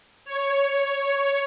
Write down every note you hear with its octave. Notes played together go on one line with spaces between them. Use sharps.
C#5